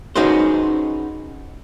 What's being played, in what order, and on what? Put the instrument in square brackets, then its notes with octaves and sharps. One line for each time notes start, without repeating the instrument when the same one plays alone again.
[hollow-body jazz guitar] C#4 D#4 F#4 G#4 B4 C5